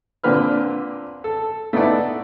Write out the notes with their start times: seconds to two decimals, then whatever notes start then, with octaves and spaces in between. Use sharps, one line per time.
0.24 A#2 D3 C4 B4 F6
1.24 A4
1.73 A3 B3 D#4 E4 D5 F#5